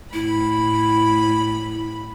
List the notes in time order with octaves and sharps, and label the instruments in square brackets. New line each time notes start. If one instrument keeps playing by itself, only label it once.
[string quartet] A2 B5 [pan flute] E4